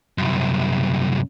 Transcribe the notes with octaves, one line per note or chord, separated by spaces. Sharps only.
C2 F#2